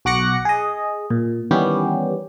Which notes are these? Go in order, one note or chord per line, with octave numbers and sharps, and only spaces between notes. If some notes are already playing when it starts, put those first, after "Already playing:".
B1 F#4 D6 F#6 A#6 C#7
G#4 D#5
A#2
D#3 E3 G3 B3 C#4 G4